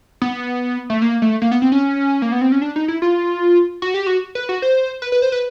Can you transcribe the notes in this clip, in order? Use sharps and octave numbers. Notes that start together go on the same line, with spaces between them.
B3
A3
A#3
A3
A#3
B3
C4
C#4
A#3
B3
C4
C#4
D4
D#4
E4
F4
F#4
G4
F#4
B4
F#4
C5
B4
B4
C5
B4